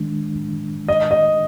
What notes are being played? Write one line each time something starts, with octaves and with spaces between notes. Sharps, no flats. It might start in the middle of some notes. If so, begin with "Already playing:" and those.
Already playing: D#3 G#3 D4
D#5
D#5